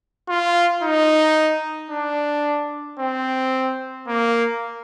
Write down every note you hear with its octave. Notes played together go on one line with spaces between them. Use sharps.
F4
D#4
D4
C4
A#3